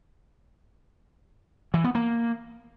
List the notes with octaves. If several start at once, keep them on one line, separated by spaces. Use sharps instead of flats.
E3
B3
A#3